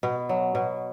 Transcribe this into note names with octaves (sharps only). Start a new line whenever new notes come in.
B2
F#3
B2